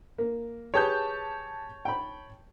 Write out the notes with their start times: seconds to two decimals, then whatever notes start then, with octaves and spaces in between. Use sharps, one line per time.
0.18 A#3
0.74 G4 G#4 B4 C#5 A5 G6
1.85 G5 B5